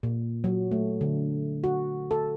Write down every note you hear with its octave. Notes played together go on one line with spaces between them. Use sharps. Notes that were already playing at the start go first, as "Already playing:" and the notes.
A#2
F#3
A3
D3
F#4
A4